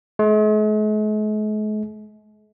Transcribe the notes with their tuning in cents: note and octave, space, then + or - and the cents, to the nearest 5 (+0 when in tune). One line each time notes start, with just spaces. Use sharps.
G#3 +45